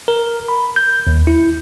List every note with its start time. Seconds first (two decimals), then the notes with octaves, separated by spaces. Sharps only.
0.08 A#4
0.48 B5
0.76 G6
1.07 D#2
1.27 E4